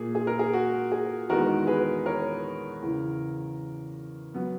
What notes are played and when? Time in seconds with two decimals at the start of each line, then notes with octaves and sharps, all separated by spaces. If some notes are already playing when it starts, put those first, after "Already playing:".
Already playing: A#2 A#3 G#4
0.15 G#4
0.27 A#4
0.39 G#4
0.53 F#4
0.92 G#4
1.29 E2 D#3 G#3 B3 F#4 A#4
1.67 G#4 B4
2.06 A#4 C#5
2.82 E2 C#3 E3
4.34 F#3 B3